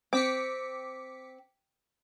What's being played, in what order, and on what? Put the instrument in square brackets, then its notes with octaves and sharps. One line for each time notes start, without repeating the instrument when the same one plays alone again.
[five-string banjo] C4 [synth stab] D6 B6 C#7